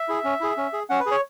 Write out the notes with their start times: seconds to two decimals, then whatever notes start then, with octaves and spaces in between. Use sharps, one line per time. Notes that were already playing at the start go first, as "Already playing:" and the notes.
Already playing: E5
0.08 E4 G#4
0.24 C#4
0.41 E4 G#4
0.57 C#4
0.73 G#4
0.89 C#4 F#5
1.00 B4
1.06 G#4
1.11 C#5